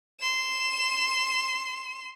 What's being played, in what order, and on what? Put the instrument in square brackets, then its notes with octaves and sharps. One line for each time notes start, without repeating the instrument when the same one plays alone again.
[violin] C6 E7